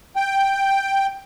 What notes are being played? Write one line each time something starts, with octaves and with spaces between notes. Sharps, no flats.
G5